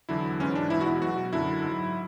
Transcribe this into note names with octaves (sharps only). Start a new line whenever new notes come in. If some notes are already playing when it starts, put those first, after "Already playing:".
E2 D3 F#3 E4
G#2 E3 G#3 C#4
D4
E2 B2 G#3 E4
F#4
E4
B2 F#3 F#4
F#2 D3 F#3 E4
G#2 F#3